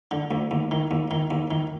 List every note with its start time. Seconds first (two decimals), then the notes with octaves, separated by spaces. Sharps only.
0.11 D3
0.31 D2
0.51 D#2
0.71 D#3
0.91 D#2
1.11 D#3
1.31 D#2
1.51 D#3